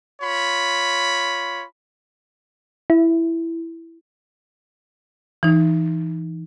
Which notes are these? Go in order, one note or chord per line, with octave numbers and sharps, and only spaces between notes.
F4 C#5 B5
E4
E3 D#4